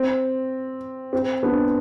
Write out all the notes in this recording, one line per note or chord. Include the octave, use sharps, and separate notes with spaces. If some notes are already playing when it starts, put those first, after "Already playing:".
Already playing: C4
C4
B3 D4